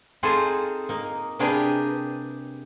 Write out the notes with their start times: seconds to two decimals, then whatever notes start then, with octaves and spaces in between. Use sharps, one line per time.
0.23 C4 D#4 F4 G#4 A4 C5
0.89 A#3 D#4
1.39 C3 A#3 D4 G4 G#4 B4